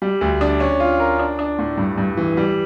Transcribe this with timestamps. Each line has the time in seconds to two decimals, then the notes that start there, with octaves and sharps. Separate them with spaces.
0.02 G3
0.21 D2
0.41 D4
0.60 C#4
0.80 F4
1.00 A#4
1.19 D4
1.39 D4
1.59 A2
1.78 G2
1.98 G2
2.17 E3
2.37 G3